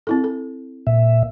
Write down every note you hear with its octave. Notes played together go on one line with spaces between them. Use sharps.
C4 E4 A4
A4
A#2 E5